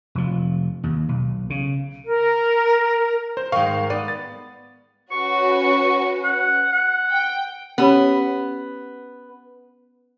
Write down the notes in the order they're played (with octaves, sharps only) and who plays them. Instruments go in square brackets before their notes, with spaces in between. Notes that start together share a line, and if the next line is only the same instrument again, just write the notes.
[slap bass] F1 F3
D#2
B1
C#3
[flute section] A#4
[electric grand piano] C5
[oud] G#2 D#3 [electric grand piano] F5 C#6
[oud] B3 [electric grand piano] D5
[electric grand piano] A6
[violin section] C#4 F#4 B4 [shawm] C#6
[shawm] F#5
F#5
[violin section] G5
[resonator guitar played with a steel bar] B3 [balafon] C#4 G4 C#5